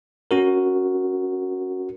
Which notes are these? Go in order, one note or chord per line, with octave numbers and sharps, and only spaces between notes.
C#4 F#4 A#4